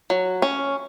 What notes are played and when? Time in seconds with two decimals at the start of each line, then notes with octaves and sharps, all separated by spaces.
0.10 F#3
0.42 C#4